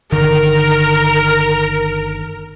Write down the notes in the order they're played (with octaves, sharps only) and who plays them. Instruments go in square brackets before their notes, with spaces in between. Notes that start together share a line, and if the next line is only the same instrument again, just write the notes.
[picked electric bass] G1 D3 D#3 [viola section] A#4